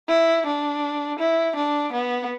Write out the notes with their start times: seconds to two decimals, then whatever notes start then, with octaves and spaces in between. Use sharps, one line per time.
0.09 E4
0.46 D4
1.19 E4
1.56 D4
1.93 B3